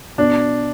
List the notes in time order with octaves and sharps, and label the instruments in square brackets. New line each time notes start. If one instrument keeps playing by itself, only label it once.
[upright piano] B2 [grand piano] D4